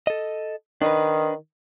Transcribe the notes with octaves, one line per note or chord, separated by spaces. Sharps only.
A4 D#5
D#3 D4 D#4 B4